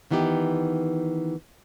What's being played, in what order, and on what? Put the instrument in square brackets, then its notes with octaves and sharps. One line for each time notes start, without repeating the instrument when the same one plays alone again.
[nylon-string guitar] D#3 E3 B3 D#4 G4